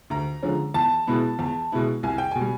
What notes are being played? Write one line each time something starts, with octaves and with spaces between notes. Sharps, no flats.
D2 A#5
D3 F3 G#3 C#4
E2 A5
B2 G#3 B3 E4
E2
B2 G#3 B3 E4
C2 G#5
G5
B2 G#5
G3